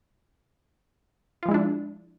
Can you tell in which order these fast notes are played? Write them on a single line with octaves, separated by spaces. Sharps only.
F4 F3 G#3 E4 D4